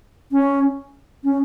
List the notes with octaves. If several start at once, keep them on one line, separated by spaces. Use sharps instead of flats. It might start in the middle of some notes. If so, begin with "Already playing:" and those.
C#4
C#4